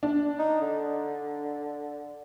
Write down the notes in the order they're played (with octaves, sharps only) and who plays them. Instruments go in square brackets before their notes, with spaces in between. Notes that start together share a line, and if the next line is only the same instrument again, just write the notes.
[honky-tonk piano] D4
[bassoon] D#4
D3